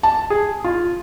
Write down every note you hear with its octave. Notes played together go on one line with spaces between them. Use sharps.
A5
G#4
F4